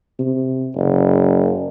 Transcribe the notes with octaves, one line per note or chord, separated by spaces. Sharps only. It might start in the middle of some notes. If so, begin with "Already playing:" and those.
C3
F#1